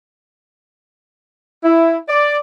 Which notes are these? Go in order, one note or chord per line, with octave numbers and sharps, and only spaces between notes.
E4
D5